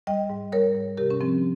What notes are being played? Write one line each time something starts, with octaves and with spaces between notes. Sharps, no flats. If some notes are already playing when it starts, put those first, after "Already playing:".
G3 D#5 G5
G#2
G3 A#4 C#5
G#2
C3 G4 A#4
C#4
F3 C4